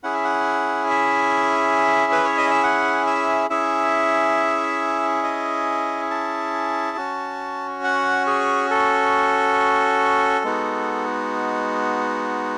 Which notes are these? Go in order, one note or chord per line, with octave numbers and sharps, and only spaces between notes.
C#4 E4 G#4 F#5
E5
F#5
E5
B4
C#5
D#5
E5
F#5
E5
C#4 E4 G#4 E5
D#5
A5
C#4 F#4
F#5
G#4
A4
G#3 B3 D#4 F#4